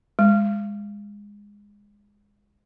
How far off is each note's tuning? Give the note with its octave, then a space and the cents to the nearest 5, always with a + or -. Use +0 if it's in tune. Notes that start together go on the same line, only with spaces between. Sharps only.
G#3 -20